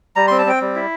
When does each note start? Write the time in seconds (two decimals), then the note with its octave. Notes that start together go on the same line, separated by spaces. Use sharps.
0.16 G3 A#5
0.27 C4 C6
0.39 A5
0.46 C4 G5
0.61 G3
0.75 E4